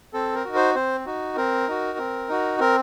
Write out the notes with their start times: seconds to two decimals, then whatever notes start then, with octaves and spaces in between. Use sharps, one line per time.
0.13 C4 A4
0.35 A#4
0.45 D#4 F#4
0.55 C5
0.75 C4 C5
1.06 D#4 F#4
1.36 C4 A#4
1.68 D#4 F#4
1.98 C4
2.29 D#4 F#4
2.60 C4 A#4